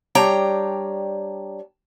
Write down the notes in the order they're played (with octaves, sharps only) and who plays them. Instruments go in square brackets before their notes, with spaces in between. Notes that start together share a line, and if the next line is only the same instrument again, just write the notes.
[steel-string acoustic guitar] G3 D4 C#5 G5 A#5